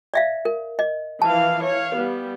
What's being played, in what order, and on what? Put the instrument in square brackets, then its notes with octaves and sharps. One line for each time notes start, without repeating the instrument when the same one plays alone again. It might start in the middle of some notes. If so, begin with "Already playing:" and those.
[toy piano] D5 E5 F5
A#4
D#5
[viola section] E3 F3 F5 [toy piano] A5
[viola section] C#5 F5
G3 B3